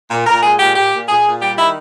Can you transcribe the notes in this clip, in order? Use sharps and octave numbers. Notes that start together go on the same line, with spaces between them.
A#2
A#2 A#4
G#3 G#4
A#2 G4
A#2 G4
A#2
A#2 G#4
A#2
G3 G4
D#3 E4